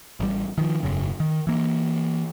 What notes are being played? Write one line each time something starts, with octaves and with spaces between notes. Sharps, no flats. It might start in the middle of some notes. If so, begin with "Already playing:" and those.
A1 G3
D#3 F3
E1 F#2 C#3
D#3
E3 A#3